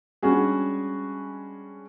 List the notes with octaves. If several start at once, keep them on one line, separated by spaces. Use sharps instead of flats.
G3 G#3 C#4 D4 F#4 G#4